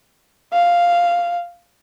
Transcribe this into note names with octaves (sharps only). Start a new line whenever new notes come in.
F5